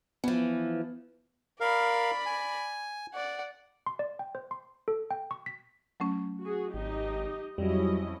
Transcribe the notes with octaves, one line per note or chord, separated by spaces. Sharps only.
E3 F3 B3
A#4 D5 F5 B5
G#5
D5 F#5
C6
D5
G5
C5
C6
A4
G5
C#6
B6
F#3 A3 C#4
F#4 G#4
G#1 D#4 G4 D#5
F2 F#3 G3 C#4 E4 D#5